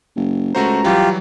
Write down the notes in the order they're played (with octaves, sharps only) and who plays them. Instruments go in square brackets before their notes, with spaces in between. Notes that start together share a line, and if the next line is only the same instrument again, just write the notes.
[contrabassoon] F#1
[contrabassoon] C#2 [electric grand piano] A3 F#4 C5 [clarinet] A#5
[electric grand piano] E3 F#3 G3 [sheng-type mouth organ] F4 G4